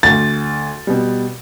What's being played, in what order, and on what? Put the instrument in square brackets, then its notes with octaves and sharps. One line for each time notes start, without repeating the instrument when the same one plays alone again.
[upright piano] D2 [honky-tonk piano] A6
[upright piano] B2 G3